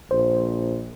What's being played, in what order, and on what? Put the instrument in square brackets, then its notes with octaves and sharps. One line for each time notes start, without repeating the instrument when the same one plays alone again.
[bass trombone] A#1 [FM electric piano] C5